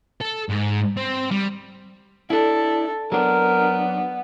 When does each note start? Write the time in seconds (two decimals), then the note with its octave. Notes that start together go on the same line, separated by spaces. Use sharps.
0.21 A4
0.50 G#2
0.97 C4
1.31 G3
2.30 D4 E4 A4
3.12 F#3 B3 D4 A#4